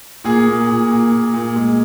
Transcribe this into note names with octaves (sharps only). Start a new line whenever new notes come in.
A#2 G#4
A#2
A#2
A#2
A#2
A#2
G#3